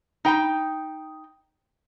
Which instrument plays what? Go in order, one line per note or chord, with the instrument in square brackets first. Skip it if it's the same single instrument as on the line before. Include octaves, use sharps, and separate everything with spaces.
[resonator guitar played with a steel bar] D#4 G5